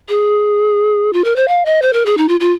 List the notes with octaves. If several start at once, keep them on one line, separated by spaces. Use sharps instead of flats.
G#4
F4
A#4
C5
F5
D#5
C5
A#4
G#4
D#4
F4
F4